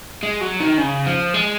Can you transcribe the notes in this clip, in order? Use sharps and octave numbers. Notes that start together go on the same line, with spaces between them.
G#3
F#3
D#3
C#3
F3
G#3